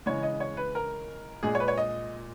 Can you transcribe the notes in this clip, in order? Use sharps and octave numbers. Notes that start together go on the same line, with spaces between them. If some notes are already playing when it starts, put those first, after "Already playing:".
C#3 E3 G#3 C#5
D#5
C#5
B4
A#4
A#2 G#3 G#4
C#5
B4
C#5
D#5